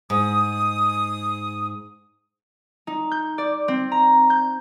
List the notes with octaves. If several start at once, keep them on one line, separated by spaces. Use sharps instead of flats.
G#2 D#6
D#4
G6
D5
C4
A#5
G6